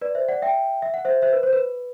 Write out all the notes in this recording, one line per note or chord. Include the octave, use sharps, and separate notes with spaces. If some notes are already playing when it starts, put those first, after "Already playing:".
B4 D5
C5 E5
D5 F#5
E5 G5
E5
F#5
C5 E5
C5 E5
B4
C5
B4